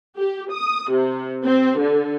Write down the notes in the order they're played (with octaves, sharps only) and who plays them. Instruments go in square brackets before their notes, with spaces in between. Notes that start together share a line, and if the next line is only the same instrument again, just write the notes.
[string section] G4
D#6
C3
C4
D3